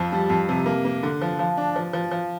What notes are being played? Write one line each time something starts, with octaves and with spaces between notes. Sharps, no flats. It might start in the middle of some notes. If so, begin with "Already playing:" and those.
Already playing: F2 F3
G3
F2
C3
A#3
A#3
D3
F3
F3
D4
F3
F3
F3